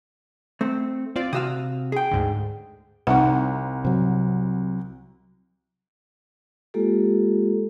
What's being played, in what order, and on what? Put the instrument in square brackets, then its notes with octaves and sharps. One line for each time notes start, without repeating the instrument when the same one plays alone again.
[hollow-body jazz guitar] A3 C4
[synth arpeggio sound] C4 F4 D5
[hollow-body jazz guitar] C3 F#4 F5 [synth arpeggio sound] D#6 E6
[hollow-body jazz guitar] G#4 G5
[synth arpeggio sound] D2 G#2 D3
[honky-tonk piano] C2 [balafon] D#4 F#5
[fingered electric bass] C3 F#3
[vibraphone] G#3 A#3 F4 G4 A4